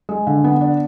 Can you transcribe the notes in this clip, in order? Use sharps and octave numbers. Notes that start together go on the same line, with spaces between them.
G#3
D3
B3
D4